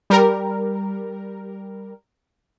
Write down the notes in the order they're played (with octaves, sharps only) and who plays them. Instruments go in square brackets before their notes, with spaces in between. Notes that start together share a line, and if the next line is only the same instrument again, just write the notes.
[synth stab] G3 A#4